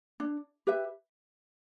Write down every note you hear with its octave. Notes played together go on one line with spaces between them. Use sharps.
D4
G4 B4 E5